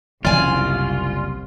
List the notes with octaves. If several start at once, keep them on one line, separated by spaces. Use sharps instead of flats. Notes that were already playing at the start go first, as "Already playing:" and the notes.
F#1 C2 F4 D5 G#5